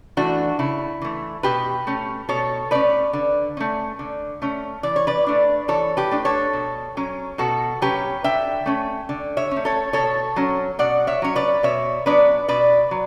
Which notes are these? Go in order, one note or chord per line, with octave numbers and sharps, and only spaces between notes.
E3 A3 D4 F#4
C#3 E4
E3 A3
B2 G4 B4
A3 C#4
B2 A4 C#5
A3 C#4 B4 D5
D3
A3 C#4
D3
A3 C#4
E3 D5
C#5
B4 D5
A3 D4
E3 A4 C#5
G4 B4
A3 D4
A4 C#5
B2
F#3 C#4
B2 F#4 A4
F#3 C#4 G4 B4
D3 E5 G5
A3 C#4
D3
C#5 E5
C#4
A3
A4 C#5
B2 A4 C#5
F#3 C#4
B2 D5 F#5
C#5 E5
F#3 C#4 C#5
B4 D5
B2 C#5 E5
F#3 B3 D4 B4 D5
B2 B4 D5
F#3